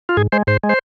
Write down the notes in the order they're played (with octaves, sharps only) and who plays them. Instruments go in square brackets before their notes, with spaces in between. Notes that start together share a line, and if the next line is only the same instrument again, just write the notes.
[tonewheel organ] F4
G#2 G#4
G#3 C5
G#2 C5
G#3
C5